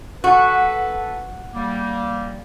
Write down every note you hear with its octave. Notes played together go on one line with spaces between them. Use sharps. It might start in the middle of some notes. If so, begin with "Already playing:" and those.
F#4 A4 B4
G3 A#3